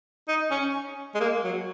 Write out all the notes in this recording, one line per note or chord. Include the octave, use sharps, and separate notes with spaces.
D#4
C#4
G#3
A#3
F#3